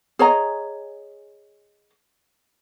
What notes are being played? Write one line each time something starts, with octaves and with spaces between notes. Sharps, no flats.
G#4 C#5 D#5 A#5